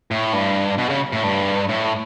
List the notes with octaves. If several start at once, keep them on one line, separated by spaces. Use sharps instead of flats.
A2
G2
B2
C#3
A2
G2
A2